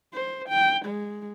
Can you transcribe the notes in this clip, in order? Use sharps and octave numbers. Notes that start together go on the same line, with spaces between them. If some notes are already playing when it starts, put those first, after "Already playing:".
C5
G5
G#3